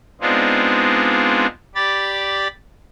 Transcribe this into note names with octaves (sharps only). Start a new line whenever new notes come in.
G#3 B3 C4 D4 D#4 F4
G4 D5 B5 A6